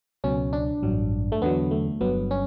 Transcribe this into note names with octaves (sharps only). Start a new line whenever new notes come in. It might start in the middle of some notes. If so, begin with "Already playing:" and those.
C#2 B2 F#3 C#4
D4
A1 G2 F#3
A3
E2 D3 F#3 B3
A3
G1 G2 F#3 B3
C#4